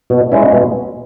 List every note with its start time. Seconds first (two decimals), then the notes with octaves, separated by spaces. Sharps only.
0.10 B2
0.32 G#3 C#4 E4
0.53 B2